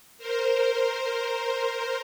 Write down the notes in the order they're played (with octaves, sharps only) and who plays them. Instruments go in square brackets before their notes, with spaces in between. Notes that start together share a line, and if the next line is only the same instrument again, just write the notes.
[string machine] A#4 C5